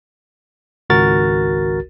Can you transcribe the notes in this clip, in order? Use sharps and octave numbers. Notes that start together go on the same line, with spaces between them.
G#1 C#2 F#4 A#4 A6